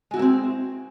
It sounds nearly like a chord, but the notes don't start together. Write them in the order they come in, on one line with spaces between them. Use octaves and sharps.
G#3 F#4 E4 A#3 C4